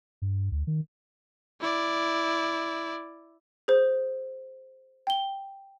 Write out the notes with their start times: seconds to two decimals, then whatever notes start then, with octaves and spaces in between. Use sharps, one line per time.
0.22 G2
0.52 D2
0.67 D#3
1.60 E4 D5
3.68 G#4 C5
5.07 G5 G7